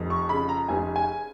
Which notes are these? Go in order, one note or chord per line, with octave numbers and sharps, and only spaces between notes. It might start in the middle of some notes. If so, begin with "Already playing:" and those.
Already playing: F1 F2
C#6
C#3 B5
A#5
F1 G#5
G#5